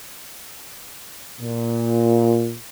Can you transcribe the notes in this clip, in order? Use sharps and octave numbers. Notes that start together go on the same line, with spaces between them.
A#2